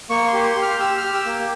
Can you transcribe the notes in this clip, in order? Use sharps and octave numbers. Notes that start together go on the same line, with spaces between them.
A#3 C#6
C6
G4
C6
G4
F6
G4 E6
F6
G4
E6
A#3